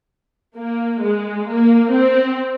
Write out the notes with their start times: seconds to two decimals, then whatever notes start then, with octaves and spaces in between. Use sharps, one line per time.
0.57 A#3
1.02 G#3
1.47 A#3
1.92 C4